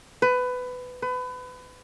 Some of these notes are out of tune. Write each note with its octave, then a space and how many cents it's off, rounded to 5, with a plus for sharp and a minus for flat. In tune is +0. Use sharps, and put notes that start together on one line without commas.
B4 +20
B4 +30